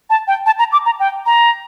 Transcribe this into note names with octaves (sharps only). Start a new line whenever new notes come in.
A5
G5
A5
A#5
D6
A#5
G5
A#5